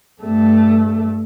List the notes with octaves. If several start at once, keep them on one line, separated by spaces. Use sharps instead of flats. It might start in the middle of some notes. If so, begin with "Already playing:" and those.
G2 A3